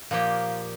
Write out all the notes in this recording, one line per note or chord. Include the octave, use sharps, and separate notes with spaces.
A#2 F3 A#3 G4 F5